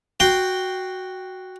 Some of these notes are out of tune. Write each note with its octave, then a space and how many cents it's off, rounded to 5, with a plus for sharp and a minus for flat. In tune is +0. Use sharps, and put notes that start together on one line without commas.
F#4 +0 G5 +0 C6 +0